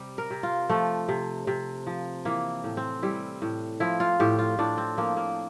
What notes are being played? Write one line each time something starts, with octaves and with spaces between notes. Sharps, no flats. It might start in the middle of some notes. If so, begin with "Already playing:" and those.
Already playing: C3 G3
A#4
C3
F4
F3 A3
C3
C3
F3
E3 A#3
A2
C4
G3 E4
A2
F3 E4
F4
A2 G4
F4
A2 D4
C4
F3 A#3
A#3